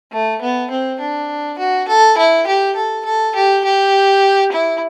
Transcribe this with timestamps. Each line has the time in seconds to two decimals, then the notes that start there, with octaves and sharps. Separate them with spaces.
0.12 A3
0.41 B3
0.71 C4
1.00 D4
1.59 F#4
1.88 A4
2.18 E4
2.47 G4
2.76 A4
3.05 A4
3.35 G4
3.64 G4
4.52 E4